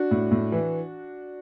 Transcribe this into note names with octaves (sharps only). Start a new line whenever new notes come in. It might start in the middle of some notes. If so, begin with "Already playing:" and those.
Already playing: D4 F#4
A2
A2
E3